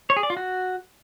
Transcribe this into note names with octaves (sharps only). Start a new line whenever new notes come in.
C#5
G#4
D5
F4
F#4